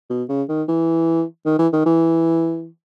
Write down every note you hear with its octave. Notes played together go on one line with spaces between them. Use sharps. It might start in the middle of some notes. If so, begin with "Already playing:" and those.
B2
C#3
D#3
E3
D#3
E3
D#3
E3